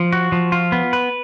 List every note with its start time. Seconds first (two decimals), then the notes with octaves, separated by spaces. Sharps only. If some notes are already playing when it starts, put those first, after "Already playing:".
Already playing: F3
0.13 F#4
0.32 F3
0.52 F4
0.72 B3
0.93 B4